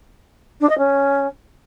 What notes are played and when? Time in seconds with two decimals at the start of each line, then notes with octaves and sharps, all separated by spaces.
0.61 D4
0.69 D#5
0.78 C#4